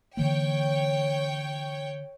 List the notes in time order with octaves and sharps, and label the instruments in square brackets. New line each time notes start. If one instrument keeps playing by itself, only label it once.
[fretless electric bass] D3 E3 A#3 [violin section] C#5 G5